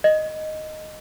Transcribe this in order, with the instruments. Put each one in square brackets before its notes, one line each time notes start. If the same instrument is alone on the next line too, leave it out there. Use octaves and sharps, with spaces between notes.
[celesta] D#5